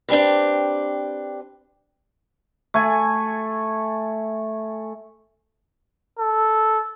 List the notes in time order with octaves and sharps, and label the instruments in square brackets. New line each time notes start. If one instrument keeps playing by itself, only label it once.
[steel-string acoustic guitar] C4 D4 G4 B4
[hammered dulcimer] A3 G#5
[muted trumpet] A4